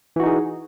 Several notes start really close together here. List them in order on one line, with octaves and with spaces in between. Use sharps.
E3 F#4 D#4 G#4